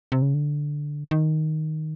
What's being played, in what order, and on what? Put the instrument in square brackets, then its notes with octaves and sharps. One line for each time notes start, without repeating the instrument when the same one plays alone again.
[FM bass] C3
C#3
D3
D#3